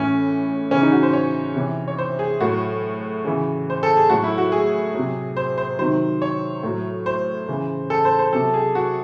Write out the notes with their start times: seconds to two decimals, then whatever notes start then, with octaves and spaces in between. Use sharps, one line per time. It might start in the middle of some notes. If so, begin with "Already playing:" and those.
Already playing: A2 E3 C#4
0.71 C#3 E3 C#4
0.82 D#4
0.92 F#4
1.03 C5
1.13 C#5
1.55 C3 E3
1.88 C#5
1.98 C5
2.19 G#4
2.40 A2 F#3 F#4
3.25 C#3 E3
3.70 C5
3.83 A4
3.97 G#4
4.09 A2 F#3 F#4
4.24 E4
4.38 F#4
4.52 G#4
4.94 C3 F#3
5.37 C5
5.58 C5
5.79 C3 D#3 F#3 C5
6.22 C#5
6.63 A2 F#3
7.06 C5
7.48 C#3 E3
7.90 A4
8.05 C5
8.19 C5
8.33 C3 F#3 A4
8.54 G#4
8.75 F#4